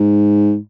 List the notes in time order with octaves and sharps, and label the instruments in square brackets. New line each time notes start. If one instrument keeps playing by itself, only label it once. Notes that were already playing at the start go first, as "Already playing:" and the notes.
Already playing: [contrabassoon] G#2